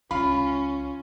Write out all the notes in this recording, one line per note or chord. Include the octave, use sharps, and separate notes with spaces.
C#2 C#3 C#4 F4 B5